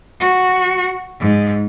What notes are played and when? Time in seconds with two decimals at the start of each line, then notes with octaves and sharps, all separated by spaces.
0.20 F#4
1.20 G#2